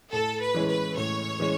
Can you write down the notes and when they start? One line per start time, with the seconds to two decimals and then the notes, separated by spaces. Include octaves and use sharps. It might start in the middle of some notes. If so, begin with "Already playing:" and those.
0.12 A2 A4
0.41 B4
0.54 E3 G#3 C#4 E4
0.69 B4
0.97 A2 C#5
1.40 E3 G#3 C#4